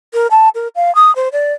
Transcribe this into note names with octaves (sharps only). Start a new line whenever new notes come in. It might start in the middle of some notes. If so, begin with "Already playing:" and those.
A#4
A5
A#4
F5
D#6
C5
D5